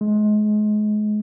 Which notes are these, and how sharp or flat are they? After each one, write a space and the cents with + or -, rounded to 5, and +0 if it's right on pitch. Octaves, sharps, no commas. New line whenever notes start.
G#3 +30